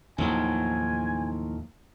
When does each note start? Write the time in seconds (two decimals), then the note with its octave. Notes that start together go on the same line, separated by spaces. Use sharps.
0.18 D#2 A2 D#3 F3 F#3 G#5